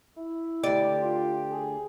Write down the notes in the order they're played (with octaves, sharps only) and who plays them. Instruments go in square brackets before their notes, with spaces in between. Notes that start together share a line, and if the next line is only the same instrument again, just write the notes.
[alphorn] E4
[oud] D2 D5 [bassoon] G4
[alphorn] F4
G#4